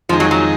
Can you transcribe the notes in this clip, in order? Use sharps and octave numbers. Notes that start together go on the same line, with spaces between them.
F2 D#3 F3 G#3 D#4
F#3
F#3